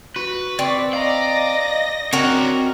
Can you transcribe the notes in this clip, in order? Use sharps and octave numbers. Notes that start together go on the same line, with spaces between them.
F#4 B4
C4 D5 C#6 D6
D5 D#5 F5 A#5 A#6
C4 D4 F#4 A#4 C#5